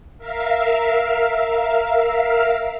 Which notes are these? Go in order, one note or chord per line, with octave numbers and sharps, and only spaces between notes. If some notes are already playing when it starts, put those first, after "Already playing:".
A#4 E5 F5